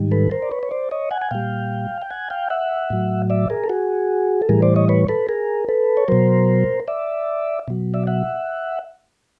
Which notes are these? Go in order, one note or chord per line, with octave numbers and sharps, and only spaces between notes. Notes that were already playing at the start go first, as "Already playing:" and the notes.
Already playing: G#2 D#3 G3
A4 B4
A#4 C5
D5
B4 C#5
C#5
C5 D5
C#5 D#5
F#5 G#5
G#5
A#2 G3 F5 G5
G5
F#5 G#5
F5 G5
E5 F#5
A2 F#3
D5 E5
G#4 A#4
A4
F#4 G#4
A4
A2 E3 G3 G#4 A#4
C5 D5
C#5 D#5
B4 C#5
A4 B4
G#4 A#4
A4 B4
C#5
B2 F#3 A#4 C5
D5 E5
B2 F#3
D5 E5
E5 F#5